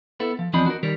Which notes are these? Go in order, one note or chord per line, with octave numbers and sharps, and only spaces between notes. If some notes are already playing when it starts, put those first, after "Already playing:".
B3 E4 A4
F3
E2 F3 C4 D4 D#5 B5
F#4 A#4
D#3 G3 A#4